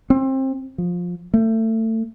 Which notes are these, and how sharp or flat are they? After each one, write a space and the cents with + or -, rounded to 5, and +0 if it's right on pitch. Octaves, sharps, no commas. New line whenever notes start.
C4 +25
F3 +15
A3 +25